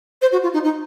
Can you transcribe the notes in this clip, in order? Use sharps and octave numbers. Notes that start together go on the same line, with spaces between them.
C5
F#4
F4
D#4
D#4